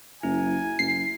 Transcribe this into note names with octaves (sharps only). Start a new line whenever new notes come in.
F#1 E4 G#5
F#1 C7